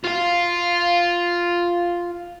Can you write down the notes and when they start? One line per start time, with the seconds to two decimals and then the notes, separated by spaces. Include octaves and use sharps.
0.05 F4 F5